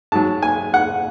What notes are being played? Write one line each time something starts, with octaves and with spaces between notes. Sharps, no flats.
G#2 F#3 A5
G#5
F#5